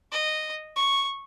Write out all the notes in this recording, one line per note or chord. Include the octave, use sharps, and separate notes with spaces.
D#5
C#6